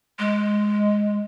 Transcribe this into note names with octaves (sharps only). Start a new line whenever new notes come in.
G#3